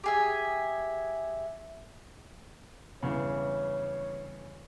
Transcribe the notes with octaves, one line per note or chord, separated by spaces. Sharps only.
G4 G#4 E5
E2 G2 C#3 C#5